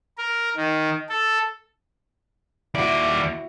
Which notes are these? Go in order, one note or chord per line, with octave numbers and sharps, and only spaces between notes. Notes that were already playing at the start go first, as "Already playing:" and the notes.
A#4
D#3
A4
D#2 E4 F#4 D5